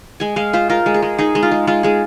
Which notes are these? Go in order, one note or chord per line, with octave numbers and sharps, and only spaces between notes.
G#3 G#5
G#3 F5
F4 C5
F4 A#4
G#3
G#4
G#3
D#4 G#4
G#3
F4
G#3
G#3 F4
G#3 G#4